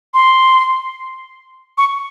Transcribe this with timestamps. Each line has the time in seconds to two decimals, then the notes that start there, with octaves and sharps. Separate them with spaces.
0.14 C6
1.78 C#6